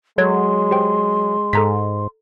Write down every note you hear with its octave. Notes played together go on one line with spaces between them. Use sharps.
F#3 G#3 A4 C#5 C6 G#6
G4 C5 G5
G#2 A4 A#5 B6